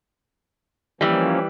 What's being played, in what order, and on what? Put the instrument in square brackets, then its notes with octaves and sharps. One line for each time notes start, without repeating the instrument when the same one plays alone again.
[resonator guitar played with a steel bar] E3 G3 [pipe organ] F3 A#3 C#4